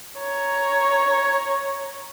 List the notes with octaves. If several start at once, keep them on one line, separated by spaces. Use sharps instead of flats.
C#5 A#5